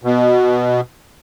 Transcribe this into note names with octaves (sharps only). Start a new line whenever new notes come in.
B2